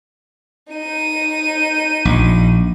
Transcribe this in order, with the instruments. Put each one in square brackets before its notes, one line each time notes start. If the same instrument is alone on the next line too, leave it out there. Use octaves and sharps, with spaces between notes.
[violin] D#4 D#7
[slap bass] A#1